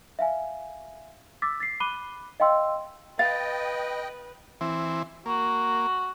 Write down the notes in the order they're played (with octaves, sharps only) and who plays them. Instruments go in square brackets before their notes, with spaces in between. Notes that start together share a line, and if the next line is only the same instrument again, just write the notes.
[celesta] E5 F5 G#5
D6 E6 A6 B6
A6 B6 C7
B5 D6 F#6 D#7 G7
D#5 F5 G5 C6 E6
[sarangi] B4 [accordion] D#5 G5 [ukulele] F5 [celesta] A6
[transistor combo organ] E3 C4
[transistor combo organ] A#3 [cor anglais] F#4